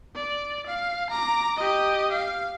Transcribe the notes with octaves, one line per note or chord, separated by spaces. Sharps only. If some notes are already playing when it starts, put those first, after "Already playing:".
D5
F5
A#5 D6
G4 D#5
F5